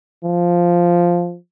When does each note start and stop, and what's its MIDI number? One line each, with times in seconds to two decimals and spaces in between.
0.25 1.36 53